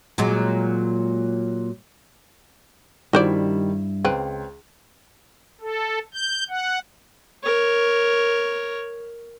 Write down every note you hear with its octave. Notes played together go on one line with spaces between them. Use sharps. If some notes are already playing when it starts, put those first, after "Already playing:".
A#2 F#3 G#3
G2 D#3 G3 D4 E4 F#4 C5 D5
C#2 C4 B4
A4
G6
F#5
A#4 C#5